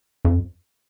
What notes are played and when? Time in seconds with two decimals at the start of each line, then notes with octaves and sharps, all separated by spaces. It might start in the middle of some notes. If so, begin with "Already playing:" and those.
0.25 F2